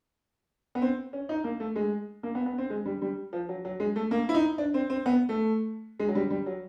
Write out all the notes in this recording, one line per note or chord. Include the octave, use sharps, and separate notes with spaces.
B3
C4
C#4
D#4
A#3
A3
G#3
A#3
B3
B3
C4
G#3
G3
G3
F3
F#3
F#3
G#3
A3
A#3
E4
D#4
D4
C4
C4
B3
A3
G#3
F#3
G3
G3
F#3